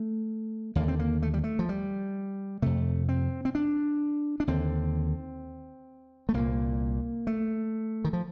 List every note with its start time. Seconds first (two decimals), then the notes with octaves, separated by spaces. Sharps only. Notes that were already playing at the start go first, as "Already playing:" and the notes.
Already playing: A3
0.75 D#2 D3 A#3
0.88 C4
0.99 A#3
1.22 A3
1.34 G3
1.44 A3
1.59 F3
1.69 G3
2.62 F2 C3 A3
3.09 C4
3.45 C4
3.55 D4
4.40 D4
4.47 D#2 D3 C4
6.29 A3
6.34 C2 A#2 A#3
7.27 A3
8.05 D#3
8.13 F3